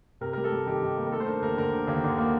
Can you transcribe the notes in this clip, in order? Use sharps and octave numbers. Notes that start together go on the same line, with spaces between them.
C3 A#4
G3 A#4
A4
G3
D#3 G4
D#3
A#3
A#4
A3 A4
C5
D4 A#4
D#2 A#4
D3 A#4
D4
D#2
D3
A#3